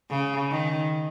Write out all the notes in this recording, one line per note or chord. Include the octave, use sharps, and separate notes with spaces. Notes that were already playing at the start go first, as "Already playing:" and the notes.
C#3
D#3